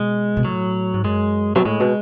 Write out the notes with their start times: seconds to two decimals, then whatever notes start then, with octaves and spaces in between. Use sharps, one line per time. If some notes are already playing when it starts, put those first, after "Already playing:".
Already playing: B2 G#3
0.37 B2
0.44 A2 F#3
0.94 G#2
1.04 F#2 G#3
1.55 B2 F#3
1.65 A2 G#3
1.80 B2